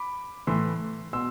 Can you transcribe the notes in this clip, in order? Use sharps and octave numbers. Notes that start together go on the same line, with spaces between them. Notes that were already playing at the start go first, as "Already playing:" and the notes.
Already playing: B5 D6
A2 E3 C6 E6
B2 C6 E6